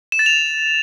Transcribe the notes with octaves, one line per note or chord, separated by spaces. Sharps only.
E7
A6
F7